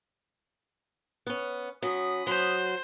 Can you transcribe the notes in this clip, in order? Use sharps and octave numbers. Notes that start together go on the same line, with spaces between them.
B3 C#4
F#3 C#4 B5 D#6
F#3 C5